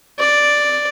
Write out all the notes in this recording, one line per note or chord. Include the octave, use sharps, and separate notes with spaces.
D5